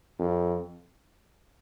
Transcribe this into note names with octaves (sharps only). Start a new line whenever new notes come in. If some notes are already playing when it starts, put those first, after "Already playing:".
F2